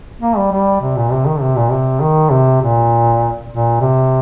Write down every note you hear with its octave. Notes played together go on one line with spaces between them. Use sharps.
A#3
G3
G3
C3
A#2
C3
D#3
C3
A#2
C3
D#3
C3
A#2
A#2
C3